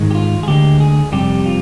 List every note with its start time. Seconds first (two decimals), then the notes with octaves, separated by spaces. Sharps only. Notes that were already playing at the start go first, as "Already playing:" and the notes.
Already playing: G#2 D#3 G#3
0.11 G4
0.15 F4
0.43 G#4
0.48 D2 D3 G#3 G4
0.80 G#4
1.12 F2 C3 G3 G4
1.46 F4